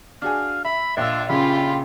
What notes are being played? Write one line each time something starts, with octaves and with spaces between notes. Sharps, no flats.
D4 F#4 G#4 F5
E5 B5
A#1 D4 F4 D#5 E5 E6
C#3 F4 G4 B5